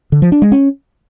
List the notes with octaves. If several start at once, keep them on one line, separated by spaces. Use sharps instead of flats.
D3
F3
D4
G#3
C#4